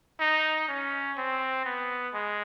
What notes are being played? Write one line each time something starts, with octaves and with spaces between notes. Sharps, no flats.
D#4
C#4
C4
B3
G#3